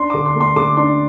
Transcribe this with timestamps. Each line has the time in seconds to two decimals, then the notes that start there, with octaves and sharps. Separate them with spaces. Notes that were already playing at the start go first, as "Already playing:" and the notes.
Already playing: D4 C6
0.10 D3 D6
0.26 C6
0.35 A3
0.40 C6
0.56 D3 D6
0.77 D4 C6